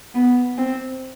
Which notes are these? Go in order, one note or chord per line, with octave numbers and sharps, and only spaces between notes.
B3
C4